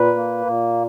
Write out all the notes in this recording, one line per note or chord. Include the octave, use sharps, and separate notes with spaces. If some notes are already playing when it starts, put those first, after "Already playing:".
Already playing: A#2 B4
A#3
A#2